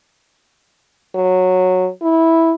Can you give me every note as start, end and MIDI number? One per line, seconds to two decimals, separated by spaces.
1.15 1.89 54
2.02 2.54 64